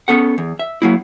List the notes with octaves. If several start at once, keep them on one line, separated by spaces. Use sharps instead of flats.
B3 C#4 A4 F#5
E2
E5
F#3 A#3 E4